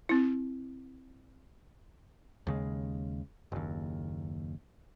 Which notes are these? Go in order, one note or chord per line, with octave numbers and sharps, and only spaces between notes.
C4 E4
D#2 C#3 G#3
F#1 D#2